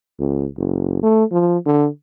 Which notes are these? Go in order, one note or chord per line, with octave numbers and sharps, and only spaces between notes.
C#2
F#1
A3
F3
D3